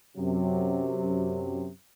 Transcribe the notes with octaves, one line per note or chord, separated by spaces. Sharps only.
F#2 C3 F#3